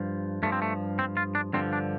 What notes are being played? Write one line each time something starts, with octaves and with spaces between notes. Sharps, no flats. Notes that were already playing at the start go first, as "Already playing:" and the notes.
Already playing: G2 F3
G2 F3 A3
C4
A3
C4
F4
D4
G2 D3 F3 C4
D4